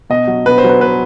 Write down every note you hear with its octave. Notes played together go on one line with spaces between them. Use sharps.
B2 D#5
F#3
B2 B4
C5
F#3
B4
B2 B4